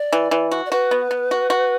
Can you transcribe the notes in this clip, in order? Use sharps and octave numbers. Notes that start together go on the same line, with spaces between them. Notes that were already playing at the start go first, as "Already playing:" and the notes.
Already playing: D5
E3
E3
F#4
D5
F#4 B4
B3
B3
F#4
F#4